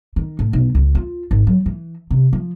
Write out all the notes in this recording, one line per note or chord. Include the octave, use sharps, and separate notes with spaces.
D#3
A2
B1
C#2
F4
G#1
F#3
E3
C3
F3